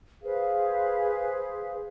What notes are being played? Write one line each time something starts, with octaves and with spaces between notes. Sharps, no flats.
G#4 B4 C5 F5